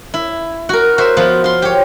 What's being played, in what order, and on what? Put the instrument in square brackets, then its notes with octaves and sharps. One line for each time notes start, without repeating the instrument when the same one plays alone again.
[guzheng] E4
F#4 A#4
F#4 C5 E5
F3 B3 F4
F4 C6
G4 C#5